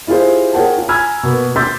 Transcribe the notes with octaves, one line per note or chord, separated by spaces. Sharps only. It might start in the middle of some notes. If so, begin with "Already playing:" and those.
E4 F4 G4 G#4 C5
G#4 A#4 C#5 F#5 G5 A5
F4
G#5 A#5 B5 E6 F6 G#6
B2 A#3 B4
C6 D6 E6 G6 A6 B6